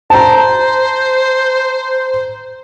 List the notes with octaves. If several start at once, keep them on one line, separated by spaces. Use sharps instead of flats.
C5 A5 A#5